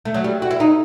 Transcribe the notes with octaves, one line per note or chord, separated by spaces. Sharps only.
A3
F#3
G3
F#4
E4
D#4